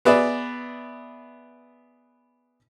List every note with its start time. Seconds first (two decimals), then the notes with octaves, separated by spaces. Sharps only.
0.05 B3 G#4 B4 D5 E5